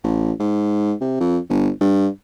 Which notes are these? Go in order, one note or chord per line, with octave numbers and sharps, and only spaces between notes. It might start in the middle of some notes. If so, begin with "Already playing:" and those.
A1
G#2
C3
F2
G1
G2